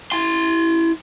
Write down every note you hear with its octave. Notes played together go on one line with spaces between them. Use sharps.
E4 C6